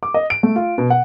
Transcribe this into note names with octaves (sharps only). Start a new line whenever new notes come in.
D6
D#5
D7
A3
F4
B2
F#5